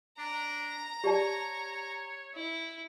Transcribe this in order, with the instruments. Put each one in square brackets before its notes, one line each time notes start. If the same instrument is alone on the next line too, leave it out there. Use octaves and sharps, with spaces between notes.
[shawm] D4 [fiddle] A#5
[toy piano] G4 D5 A5 [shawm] C#5
[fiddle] E4